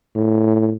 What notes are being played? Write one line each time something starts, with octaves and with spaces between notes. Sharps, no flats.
A2